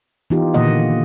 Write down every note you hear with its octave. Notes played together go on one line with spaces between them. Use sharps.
E3 B3 D#4 F4 G4
A#2 D3 D#3 A#3 D#5 F#5